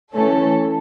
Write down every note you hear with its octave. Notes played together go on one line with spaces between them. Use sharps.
E3 A3 C#4 A4